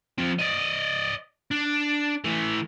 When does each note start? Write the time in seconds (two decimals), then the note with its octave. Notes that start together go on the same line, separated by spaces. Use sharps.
0.18 F3 C4
0.39 D5 D#5
1.51 D4
2.24 E3 A3